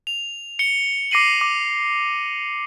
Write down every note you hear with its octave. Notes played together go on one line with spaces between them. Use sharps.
F7
C#7 G7
D6 A#6 C7 D#7 F#7
D6